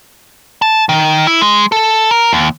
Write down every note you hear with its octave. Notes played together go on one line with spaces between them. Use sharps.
A5
D#3
E4
G#3
A4
A#4
D#2